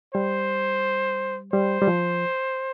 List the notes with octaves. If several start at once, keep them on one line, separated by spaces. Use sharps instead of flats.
G3 C5
G3 C5
G3
F3